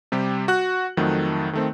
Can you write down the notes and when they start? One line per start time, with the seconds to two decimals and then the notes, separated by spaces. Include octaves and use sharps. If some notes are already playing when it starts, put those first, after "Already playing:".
0.12 C3 G3 G4
0.48 F#4 F#6
0.97 F2 D#3 F#3 A3
1.53 D#3 A3 C4